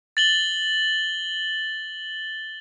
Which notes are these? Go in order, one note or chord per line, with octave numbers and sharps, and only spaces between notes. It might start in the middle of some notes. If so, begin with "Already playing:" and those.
A6 F#7 G7